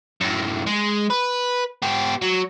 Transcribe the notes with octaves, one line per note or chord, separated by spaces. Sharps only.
F#2 A2
G#3
B4
B3 G4
F#3